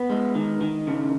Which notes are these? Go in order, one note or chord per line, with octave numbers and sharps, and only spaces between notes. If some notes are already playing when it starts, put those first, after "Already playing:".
Already playing: B3
G#3
D#3
D#3
C#3